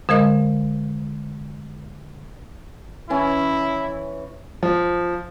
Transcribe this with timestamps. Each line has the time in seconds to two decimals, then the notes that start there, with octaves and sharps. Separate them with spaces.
0.09 D3 G#3 A#4 D#5
3.10 E3 C#4 E4
4.63 F3